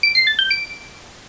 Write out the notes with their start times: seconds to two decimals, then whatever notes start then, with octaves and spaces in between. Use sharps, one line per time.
0.03 D7
0.15 C7
0.27 A6
0.39 G6
0.50 D7